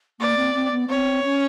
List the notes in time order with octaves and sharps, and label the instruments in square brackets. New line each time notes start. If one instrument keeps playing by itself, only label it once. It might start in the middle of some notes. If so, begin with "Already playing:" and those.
[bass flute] A#3 [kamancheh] D5
[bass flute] C4
C4
B3
[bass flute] C4 [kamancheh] C#5
[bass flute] C#4